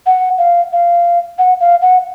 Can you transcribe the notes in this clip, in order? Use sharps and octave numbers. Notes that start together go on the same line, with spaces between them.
F#5
F5
F5
F#5
F5
F#5